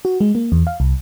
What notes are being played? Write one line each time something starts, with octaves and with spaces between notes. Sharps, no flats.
F#4
G#3
A#3
E2
F5
C2